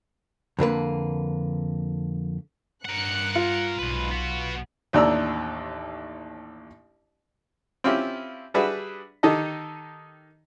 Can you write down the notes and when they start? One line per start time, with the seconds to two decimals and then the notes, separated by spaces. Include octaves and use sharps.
0.59 F2 D3 A#3 B4
2.85 G2 A#4 F#5 F#6 C#7
3.36 F4
3.79 B1 G#2 B4
4.11 B3 F#4
4.93 A1 D#2 D4 D5 A#5 E6
7.84 C4 C#4 E4 F4 G4
8.54 G3 D4 F#4 G#4 B4 E5
9.23 D#3 D#4 G4 A4 D#5